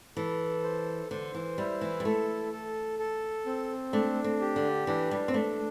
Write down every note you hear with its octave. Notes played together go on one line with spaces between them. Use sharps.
E3 A4
C5
D3 C5
E3
G3 E4
E3
G3
A3 A4
A4
A4
C4
A3 D4
C4
G4
D3
E3 D4
G3
C4
A3 D4